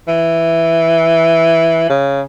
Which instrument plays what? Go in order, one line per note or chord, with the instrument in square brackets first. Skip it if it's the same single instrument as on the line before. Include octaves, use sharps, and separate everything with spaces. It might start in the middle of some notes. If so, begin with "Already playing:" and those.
[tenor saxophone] E3
C#3